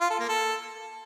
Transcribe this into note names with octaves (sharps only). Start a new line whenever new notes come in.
F4
A4
A#3
A4